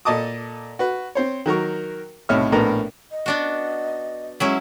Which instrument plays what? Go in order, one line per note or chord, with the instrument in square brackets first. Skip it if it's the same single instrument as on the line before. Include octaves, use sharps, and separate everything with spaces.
[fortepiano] A#2 A4 D#5 A5 D6 D#6
F#4 B4
C4 C5 C#5
D#3 F#3 A#4 C#6
B1 A2 C3 C#5 E5 F6
A#1 A2 B3 A#4 A#5
[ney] D#5
[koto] B3 D4 F#4
[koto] F#3 C#4 E4 [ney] G#3